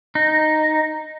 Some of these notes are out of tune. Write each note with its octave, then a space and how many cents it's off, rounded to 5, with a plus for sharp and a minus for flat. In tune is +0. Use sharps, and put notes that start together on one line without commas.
D#4 -5